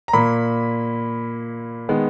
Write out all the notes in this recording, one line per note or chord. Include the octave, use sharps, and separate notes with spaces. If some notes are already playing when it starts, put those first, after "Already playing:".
A#5
A#2 A#3 B5
D#3 G#3 B3